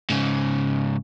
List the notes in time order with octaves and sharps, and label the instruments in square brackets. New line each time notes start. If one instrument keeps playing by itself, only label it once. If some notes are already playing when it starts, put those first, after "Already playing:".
[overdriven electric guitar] G#2 C#3